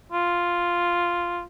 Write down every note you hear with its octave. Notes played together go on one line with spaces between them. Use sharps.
F4